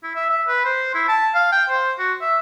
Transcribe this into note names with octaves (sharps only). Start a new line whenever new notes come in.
E4
E5
E5
B4
C5
E4
A5
F5
G5
C5
F#4
E5